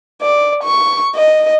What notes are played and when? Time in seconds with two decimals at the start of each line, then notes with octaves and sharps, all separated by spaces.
0.22 D5
0.63 C#6
1.16 D#5